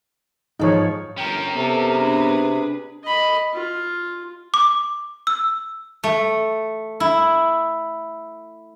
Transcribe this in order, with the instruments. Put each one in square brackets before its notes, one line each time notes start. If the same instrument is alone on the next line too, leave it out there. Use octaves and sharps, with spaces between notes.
[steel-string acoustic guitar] G#2 F3 [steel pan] D#4 C#5
[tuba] G1 [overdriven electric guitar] C#4 A#4 [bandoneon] G5
[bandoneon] C3 [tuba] B3 [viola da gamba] A4
[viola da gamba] D4 G#4 B4
[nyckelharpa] D#5 B5
F4
[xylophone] D6
E6
[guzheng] A3
E4